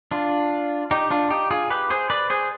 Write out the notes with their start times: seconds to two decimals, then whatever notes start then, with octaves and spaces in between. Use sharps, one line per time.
0.11 D4 F4
0.91 D#4 G4
1.11 D4 F4
1.30 D#4 G4
1.51 F4 G#4
1.70 G4 B4
1.90 G#4 C5
2.10 B4 D5
2.30 G#4 C5